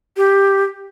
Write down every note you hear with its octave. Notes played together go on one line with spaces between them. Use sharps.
G4